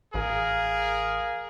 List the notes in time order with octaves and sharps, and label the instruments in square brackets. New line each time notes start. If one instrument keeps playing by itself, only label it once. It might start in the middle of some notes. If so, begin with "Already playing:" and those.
[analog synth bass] A1 [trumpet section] G#4 A#4 F5